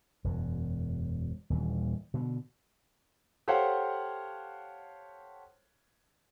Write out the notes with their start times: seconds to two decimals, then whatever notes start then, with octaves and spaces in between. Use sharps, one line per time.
0.24 E1 F#2
1.50 D#1 D#2 E3
2.14 B2 D3
3.48 G4 A4 C5 C#5 F5 F#5